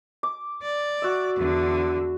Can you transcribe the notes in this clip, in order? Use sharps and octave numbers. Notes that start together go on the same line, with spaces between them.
D6
D5
F#4 E5
E2 D3